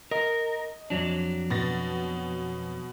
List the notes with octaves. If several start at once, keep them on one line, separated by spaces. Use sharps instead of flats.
A#4 D#5
F2 F#3 D4
B2 A6 A#6